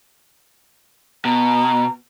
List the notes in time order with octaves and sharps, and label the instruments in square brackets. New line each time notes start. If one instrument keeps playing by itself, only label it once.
[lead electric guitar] B2 [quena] A#5